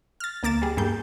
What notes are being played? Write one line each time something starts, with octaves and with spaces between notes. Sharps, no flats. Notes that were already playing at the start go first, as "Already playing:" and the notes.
F6 A6
D2 A#3 D6 A6 E7
G3 G#4
G2 G3 A#3 G#4 G6